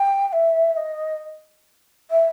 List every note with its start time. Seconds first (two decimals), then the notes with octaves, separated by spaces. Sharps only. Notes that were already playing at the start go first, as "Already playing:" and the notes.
Already playing: G5
0.27 G5
0.32 E5
0.73 E5
0.76 D#5
2.11 E5